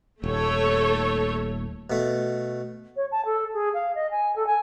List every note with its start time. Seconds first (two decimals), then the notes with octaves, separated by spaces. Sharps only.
0.24 D#1 A3 A4 C#5
1.90 B2 A3
2.96 C#5
3.11 A5
3.25 A4
3.53 G#4
3.74 F5
3.95 D#5
4.11 G#5
4.35 A4
4.47 G#5